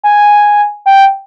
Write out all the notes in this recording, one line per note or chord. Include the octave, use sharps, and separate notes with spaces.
G#5
G5